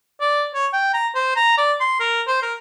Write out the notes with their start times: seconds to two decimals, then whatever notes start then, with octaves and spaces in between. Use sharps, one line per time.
0.21 D5
0.54 C#5
0.73 G5
0.94 A#5
1.15 C5
1.36 A#5
1.58 D5
1.80 C6
2.00 A#4
2.27 C5
2.42 A#4